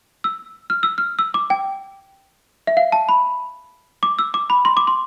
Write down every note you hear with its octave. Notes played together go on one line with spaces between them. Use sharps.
E6
F6
E6
F6
E6
D6
G5
E5
F5
A5
B5
D6
E6
D6
B5
C6
D6
C6